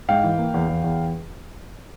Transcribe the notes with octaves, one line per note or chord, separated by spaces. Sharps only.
G#2 F5 G5
E3
A#3
E2
E2
E2